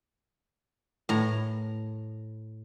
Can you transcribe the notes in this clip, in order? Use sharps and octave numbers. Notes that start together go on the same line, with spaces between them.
A2 A#5